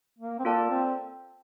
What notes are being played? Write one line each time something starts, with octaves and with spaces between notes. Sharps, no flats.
A#3
C4
A#3 F4 A4 D5 A5
C4